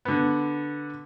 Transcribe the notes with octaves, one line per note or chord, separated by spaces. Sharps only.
D3 B3